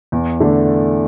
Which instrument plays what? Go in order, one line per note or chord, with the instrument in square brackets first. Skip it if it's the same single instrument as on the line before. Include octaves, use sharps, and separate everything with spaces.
[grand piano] E2
D3 A3 D4